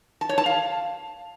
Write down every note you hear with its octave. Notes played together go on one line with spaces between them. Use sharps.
A5
C#5
A5
F5